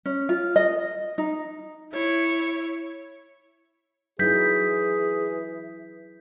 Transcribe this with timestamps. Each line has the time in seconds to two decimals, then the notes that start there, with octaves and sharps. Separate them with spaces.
0.06 C#4
0.29 F4
0.56 D#5
1.18 D#4
1.92 E4 C#5
4.19 E3 F#3 D#4 E4 G#4 G6 B6